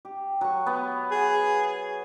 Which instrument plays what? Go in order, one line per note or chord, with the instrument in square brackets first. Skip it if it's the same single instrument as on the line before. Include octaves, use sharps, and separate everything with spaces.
[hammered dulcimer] G4
F#3 C#6
B3
[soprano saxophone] G#4